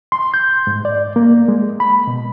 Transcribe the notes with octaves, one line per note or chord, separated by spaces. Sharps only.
C6
G6
G#2
D5
A#3
G#3
B5
B2